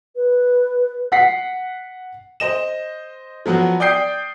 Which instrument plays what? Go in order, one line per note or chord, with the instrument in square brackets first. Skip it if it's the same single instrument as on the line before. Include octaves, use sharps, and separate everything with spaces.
[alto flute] B4
[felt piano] F#5 B6 C7
[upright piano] C5 D#5 E7
F3 F#3 B3 F#4
D5 G5 D#6 G6 C7